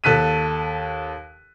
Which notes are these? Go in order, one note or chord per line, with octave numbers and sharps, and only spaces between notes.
D#2 A4 F#6 B6 D#7